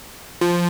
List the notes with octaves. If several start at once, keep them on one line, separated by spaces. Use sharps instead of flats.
F3